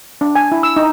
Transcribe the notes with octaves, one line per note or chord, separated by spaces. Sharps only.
D4
G#5
E4
E6
D#4